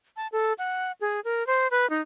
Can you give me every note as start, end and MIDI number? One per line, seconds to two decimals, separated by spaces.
0.16 0.27 81
0.32 0.53 69
0.58 0.92 78
1.01 1.20 68
1.25 1.46 70
1.47 1.68 72
1.71 1.89 71
1.90 2.01 63